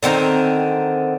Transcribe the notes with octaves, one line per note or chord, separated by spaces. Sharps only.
D3 D#3 C4 A#5